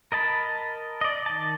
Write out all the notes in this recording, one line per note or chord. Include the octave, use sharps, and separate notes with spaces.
A#4 D#5 A5 B5
D5 D#5
D#3 A5